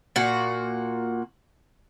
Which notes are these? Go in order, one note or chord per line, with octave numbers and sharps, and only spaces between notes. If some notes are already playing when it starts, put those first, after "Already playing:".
A#2 F#4